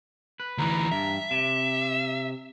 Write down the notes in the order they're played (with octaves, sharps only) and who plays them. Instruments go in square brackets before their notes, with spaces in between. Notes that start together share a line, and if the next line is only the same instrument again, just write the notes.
[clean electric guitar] B4
[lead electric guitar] D2 E3 [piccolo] A#5
[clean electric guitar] G2 [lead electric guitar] E5
[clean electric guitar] C3 [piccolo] E7